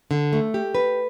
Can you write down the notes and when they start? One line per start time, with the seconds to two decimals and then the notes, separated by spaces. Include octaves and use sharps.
0.11 D3
0.33 A3
0.54 G4
0.75 B4